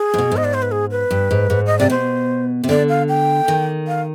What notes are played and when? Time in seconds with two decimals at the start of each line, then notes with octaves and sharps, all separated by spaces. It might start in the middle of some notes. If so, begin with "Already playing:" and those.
Already playing: G#4
0.14 G#2
0.18 B2
0.32 G#2
0.37 D#5
0.44 D5
0.54 C5
0.62 B4
0.72 G#4
0.91 B4
1.11 G2
1.31 G#2
1.50 G#2
1.67 D#5
1.79 C3 D5
1.90 B2 C5
2.64 C3
2.69 D3 D5
2.89 F5
3.09 G5
3.48 D#3
3.88 F5